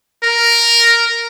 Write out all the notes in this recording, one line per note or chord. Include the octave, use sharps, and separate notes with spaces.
A#4